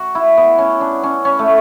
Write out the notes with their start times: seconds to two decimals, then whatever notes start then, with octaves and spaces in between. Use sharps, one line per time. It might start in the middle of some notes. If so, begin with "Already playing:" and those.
Already playing: F#4
0.15 E4
0.37 B3
0.58 C#4
0.81 D4
1.03 C#4
1.25 C#4
1.39 A3